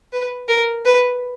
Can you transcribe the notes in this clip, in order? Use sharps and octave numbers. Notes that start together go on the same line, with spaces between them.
B4
A#4
B4